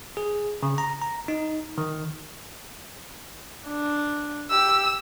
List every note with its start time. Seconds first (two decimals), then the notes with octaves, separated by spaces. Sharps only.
0.17 G#4
0.63 C#3
0.78 A#5
1.02 A#5
1.28 D#4
1.78 D#3
3.68 D4
4.50 G4 E6